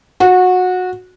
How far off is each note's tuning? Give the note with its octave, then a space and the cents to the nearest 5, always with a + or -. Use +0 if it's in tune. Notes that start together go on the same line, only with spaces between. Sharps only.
F#4 -20